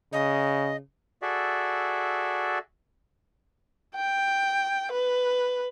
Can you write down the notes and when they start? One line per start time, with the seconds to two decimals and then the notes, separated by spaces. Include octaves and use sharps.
0.13 C#3 D#5
1.22 F#4 G#4 A4 D5 E5
3.95 G5
4.92 B4